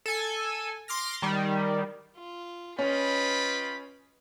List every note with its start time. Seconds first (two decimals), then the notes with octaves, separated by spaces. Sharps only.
0.06 A4 G#5
0.88 C6 D6 F6 A#6
1.22 D#3 G3
2.17 F4
2.79 C#4 F4 B4 D#5 G5 B5